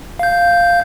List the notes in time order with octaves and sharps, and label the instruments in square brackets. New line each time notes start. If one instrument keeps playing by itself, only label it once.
[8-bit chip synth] F5 G6